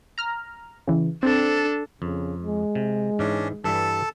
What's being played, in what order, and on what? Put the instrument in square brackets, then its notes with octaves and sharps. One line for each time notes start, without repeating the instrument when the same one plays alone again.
[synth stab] A#5 F6
C#3 E3
[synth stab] C4 [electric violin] D4 A4
[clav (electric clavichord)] F2 [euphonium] C#3
[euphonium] G#3
[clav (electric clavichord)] C3
[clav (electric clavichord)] G#2 E3 [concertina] C#4 D4
[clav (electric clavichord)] G2 E3 G3 [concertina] A4 A5